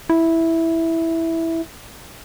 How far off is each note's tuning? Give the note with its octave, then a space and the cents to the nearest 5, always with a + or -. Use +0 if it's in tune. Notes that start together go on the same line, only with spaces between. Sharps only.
E4 -5